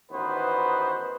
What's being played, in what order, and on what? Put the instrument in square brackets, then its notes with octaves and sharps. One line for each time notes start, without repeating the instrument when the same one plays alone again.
[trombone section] A1 D#3 B3 F#4 B4 C5